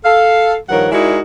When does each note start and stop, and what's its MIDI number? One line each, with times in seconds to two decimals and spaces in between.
0.04 0.56 69
0.04 0.56 77
0.69 0.91 43
0.69 0.91 51
0.69 0.91 53
0.69 0.91 70
0.69 0.91 73
0.69 0.91 78
0.92 1.19 56
0.92 1.19 63
0.92 1.19 64
0.92 1.19 66
0.92 1.19 70
0.92 1.19 74